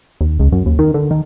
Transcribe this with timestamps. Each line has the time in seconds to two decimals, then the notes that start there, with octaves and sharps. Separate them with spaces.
0.21 D#2
0.40 C#2
0.52 F#2
0.66 D#2
0.79 D#3
0.94 D3
1.11 D#3